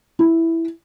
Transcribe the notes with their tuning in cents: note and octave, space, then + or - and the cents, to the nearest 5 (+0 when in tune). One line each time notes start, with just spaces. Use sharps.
E4 +0